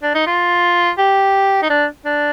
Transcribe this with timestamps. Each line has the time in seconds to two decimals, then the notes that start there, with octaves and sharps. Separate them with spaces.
0.03 D4
0.15 D#4
0.26 F4
0.98 G4
1.62 D#4
1.70 D4
2.05 D4